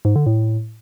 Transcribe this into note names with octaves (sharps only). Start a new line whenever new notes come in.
G#2
D3
A2